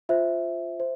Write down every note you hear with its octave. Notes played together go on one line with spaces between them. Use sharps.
F4 C5 E5
C5